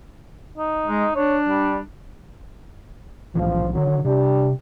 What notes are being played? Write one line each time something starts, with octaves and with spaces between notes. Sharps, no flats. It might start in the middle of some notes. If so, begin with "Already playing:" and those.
D#4
G#3
D4 C#5
G3
B1 A2 E3 F3
D3 D#3 F#3
C3 G3 D4 G4